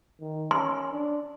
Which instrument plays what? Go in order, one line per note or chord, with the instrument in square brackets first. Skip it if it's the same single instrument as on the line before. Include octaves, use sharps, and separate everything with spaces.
[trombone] D#3
[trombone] C#4 [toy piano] C6
[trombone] D4